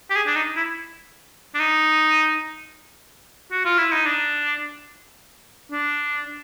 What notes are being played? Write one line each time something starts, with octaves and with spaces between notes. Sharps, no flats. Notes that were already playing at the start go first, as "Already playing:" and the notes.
G4
G#4
D4
D#4
E4
D4
D#4
F#4
F4
E4
D#4
D4
D4